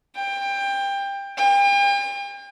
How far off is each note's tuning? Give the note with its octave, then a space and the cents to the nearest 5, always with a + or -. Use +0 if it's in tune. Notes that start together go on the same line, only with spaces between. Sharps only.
G5 +20
G5 +40